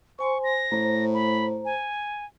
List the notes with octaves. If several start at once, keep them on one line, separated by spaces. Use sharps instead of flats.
C5 G#5 C6 C#6
A#6
A2 C5 A#5
B5
G#5